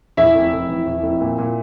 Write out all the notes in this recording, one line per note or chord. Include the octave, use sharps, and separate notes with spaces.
E2 E4 E5
F1
F1
E3
E2
F1
A#2
A#2